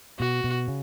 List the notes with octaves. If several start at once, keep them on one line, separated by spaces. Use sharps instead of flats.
B2 F#4
B2
C#3